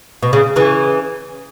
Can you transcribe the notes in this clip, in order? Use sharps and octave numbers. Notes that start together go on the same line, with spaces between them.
B2
C#3
C#3 E3